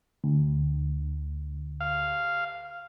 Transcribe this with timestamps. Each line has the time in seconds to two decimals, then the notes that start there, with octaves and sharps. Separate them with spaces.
0.24 D2
1.81 F5